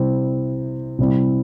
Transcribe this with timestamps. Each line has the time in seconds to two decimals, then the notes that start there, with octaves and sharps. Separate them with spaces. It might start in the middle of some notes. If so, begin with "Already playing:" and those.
Already playing: C3 G3 C4 E4
0.99 C3 G3 C4 E4